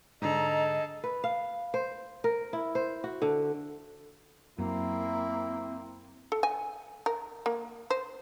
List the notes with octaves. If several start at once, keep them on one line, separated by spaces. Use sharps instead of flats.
G#2 D3 G#4 A4 D#5 A#5
B4
F5
C5
A#4
E4
C5
F#4
D3
F#2 A#3 C4 E4
A4
G#5
A#4
A#3
C5